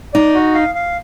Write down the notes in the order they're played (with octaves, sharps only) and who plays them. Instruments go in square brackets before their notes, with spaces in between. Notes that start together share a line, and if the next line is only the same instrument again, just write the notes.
[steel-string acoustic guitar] D#4 [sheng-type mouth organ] D5
[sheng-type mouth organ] F#4
F5
F5